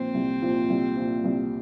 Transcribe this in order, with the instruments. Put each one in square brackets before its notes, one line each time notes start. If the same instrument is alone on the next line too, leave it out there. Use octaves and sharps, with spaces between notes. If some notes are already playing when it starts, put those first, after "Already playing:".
Already playing: [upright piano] A#2 F3 [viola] C4
[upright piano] C2
A#2 F3
C2
A#2 F3
C2